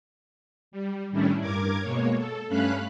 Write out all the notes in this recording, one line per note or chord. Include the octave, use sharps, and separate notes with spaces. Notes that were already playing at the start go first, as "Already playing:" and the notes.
G3
A2 D#3 G3 C#4 D4 E4
G2 A#4 D6 G#6
B2 G#3 A#3 C#5
A4
G2 A3 C#4 F5 B5 F#6